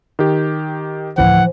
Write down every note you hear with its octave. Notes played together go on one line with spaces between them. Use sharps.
D#3 G4
A1 D2 E3 F3 F#5